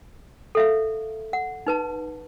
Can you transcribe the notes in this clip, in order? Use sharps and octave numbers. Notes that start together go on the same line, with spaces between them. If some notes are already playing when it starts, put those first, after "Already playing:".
A4 E5 F5
F#5
D#4 B4 A5